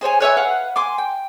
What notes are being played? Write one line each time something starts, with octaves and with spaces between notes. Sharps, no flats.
G#4 C5 C#5 G#5
B4 C#5 E5 G#5
B4 F5 F#5
G#5 C6 D6
G5